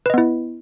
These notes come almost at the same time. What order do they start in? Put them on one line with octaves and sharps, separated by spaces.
B4 D#5 B3 E4